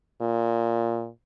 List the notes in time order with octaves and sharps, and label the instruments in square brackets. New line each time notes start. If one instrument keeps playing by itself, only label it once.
[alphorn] A#2